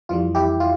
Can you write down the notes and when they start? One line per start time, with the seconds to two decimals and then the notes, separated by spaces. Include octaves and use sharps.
0.09 F2 E3 G3 F4
0.35 E4 G4
0.60 F4